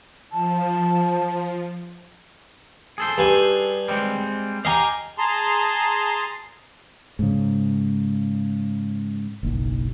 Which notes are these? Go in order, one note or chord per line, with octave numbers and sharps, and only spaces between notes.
F3 A5
G#4 A4 C5
G2 G#5
G3 G#3 C4
G4 D#5 F5 G#5 A#5
G#4 A5 A#5 C6
G#2 C#3
F#1 B1